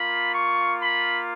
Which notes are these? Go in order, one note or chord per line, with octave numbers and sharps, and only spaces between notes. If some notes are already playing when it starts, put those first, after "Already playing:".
Already playing: A#3 F4 B5
C#6
B5